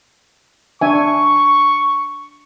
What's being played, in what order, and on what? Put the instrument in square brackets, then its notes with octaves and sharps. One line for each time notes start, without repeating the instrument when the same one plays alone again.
[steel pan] D4 E5 G#5 [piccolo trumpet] C#6